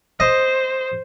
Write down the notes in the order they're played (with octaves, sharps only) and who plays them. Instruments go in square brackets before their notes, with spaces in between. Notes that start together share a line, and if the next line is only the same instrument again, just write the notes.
[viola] C5 [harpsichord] D#5